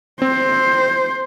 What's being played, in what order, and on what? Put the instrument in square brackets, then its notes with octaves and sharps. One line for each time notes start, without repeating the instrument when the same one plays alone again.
[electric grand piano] C4 [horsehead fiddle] C5